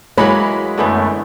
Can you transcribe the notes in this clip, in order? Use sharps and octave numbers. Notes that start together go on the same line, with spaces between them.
E3 F#3 G#3 A#3 C#5 B5
F#2 D3 E3 A3 B3